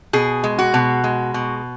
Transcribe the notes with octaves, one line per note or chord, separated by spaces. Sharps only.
B2 G#4
G#3
F#4
B2
G#3
B2